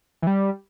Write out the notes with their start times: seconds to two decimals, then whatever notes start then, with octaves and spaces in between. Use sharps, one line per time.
0.22 E3
0.27 G3